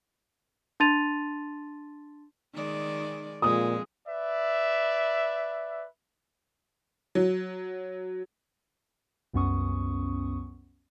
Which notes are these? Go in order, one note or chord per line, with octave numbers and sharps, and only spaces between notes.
D4 A5 C6 A6 D#7 F7
D#3 G#3 D5
F2 A#2 G#3 D#6
B4 D5 E5
F#3
C2 F#2 B3 C#4 C#6 D#6